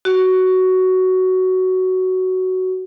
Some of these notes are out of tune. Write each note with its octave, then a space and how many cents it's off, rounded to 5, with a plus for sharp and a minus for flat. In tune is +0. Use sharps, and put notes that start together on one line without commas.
F#4 +10